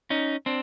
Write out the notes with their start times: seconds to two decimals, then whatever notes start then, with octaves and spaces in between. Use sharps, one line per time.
0.10 C#4 D#4
0.46 C4 D4